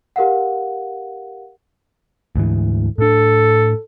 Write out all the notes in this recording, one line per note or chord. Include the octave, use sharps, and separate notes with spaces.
G4 A#4 F5 F#5
D2 G#2 E3
A2 D4 A4